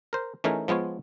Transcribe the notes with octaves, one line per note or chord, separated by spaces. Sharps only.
A#4 C5
E3 A3 C#4 D#4 G#4 A#4
F3 G#3 B3 F4 C#5